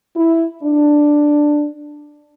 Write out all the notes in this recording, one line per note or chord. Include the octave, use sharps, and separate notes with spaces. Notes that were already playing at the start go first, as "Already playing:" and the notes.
E4
D4